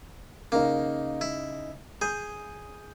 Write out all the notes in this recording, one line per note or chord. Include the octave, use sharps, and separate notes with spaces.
C#3 A#3 D#4
E4
G#4 G6